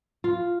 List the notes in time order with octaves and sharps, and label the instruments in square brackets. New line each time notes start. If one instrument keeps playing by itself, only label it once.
[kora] F4